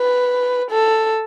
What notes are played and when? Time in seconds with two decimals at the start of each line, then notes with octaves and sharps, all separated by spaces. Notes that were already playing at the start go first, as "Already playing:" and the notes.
Already playing: B4
0.71 A4